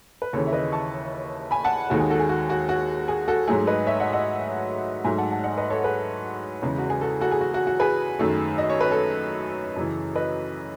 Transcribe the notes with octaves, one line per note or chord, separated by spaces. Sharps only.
B4
D#2 C#3 E3 A4 C#5
E5
B4 D#5
A5 C#6
G#5 B5
F#5 A5
D#2 D#3 G#3 F#4 A4
G#4
F#4 A4
G#4
F#4
F#4
F#4
G#4
F#4 A4
G#2 F#3 A3 G#4
B4 D#5
C#5 E5
D#5 F#5
D#5 F#5
G#2 F#3 A3 E5 G#5
F#5 A5
F#5 A5
D#5 F#5
B4 D#5
A4 C#5
G#4 B4
E2 C#3 G#3
F#4
G#4
F#4 A4
F#4 A4
G#4
F#4
F#4
F#4
G#4 B4
F#2 D#3 A3
D#5
C#5
B4
A4 C#5
F#2 C#3 E3
B4 D#5